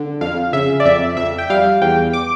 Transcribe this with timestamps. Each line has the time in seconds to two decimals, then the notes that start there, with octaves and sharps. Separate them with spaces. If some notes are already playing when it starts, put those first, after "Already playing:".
Already playing: D3
0.21 F2 F5
0.53 C#3 E5
0.80 D5
0.85 F2 E5
1.17 F2 E5
1.38 G5
1.50 G3 F5
1.82 E2 G5
2.13 D6